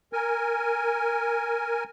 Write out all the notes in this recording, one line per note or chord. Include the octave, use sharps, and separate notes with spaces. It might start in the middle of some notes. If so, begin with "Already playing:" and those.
A#4 G#5